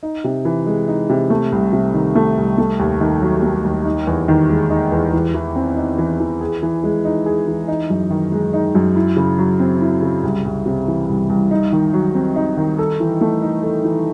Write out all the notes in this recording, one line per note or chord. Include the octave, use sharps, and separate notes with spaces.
D#4
C3
E3
G#3
D#4
C3
A3
C2
C3
D#3
A3
C2
A3
D#2
D#3
F#3
A3
D#2
D#4
E2
D#3
G#3
D#4
E2
E3
E3
C4
D#4
E3
E3
G#4
E3
G#3
D#4
G#4
E3
D#4
F#2
D#3
G#3
D#4
F#2
E4
C#3
F#3
C4
E4
C#3
C2
C2
C3
E3
C2
C2
D#4
D#3
F#3
C4
D#4
D#3
A4
E3
A3
D#4
A4
E3